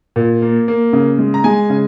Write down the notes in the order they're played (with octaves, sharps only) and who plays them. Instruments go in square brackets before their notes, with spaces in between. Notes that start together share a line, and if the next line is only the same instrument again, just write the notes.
[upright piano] A#2
A#3
A#3
C#3
G#3
A#5
G#3 G#5
C#3